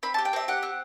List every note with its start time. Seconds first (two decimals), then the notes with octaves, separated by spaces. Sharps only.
0.03 C4 B5
0.14 A5
0.18 G4
0.25 G5
0.33 C4 E5
0.48 G4 F#5
0.63 C4